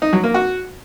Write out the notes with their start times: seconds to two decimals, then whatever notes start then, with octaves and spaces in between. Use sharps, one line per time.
0.02 D#4
0.13 F#3
0.24 A#3
0.34 F#4